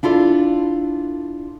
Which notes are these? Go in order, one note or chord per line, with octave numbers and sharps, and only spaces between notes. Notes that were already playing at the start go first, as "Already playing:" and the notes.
D4 E4 F4 A4 D5